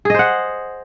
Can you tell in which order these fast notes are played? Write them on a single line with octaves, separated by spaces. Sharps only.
G#4 D#5 C5 F#5